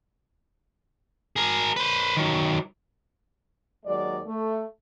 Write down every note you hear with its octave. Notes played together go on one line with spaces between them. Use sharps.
G#4 A#4
B4 C5
D#3 F#3
D#2 F#3 G#3 D5
A3